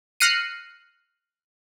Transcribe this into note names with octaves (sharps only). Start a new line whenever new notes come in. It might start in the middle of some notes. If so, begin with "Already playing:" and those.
F6 F#6 A#6 C7 C#7 D#7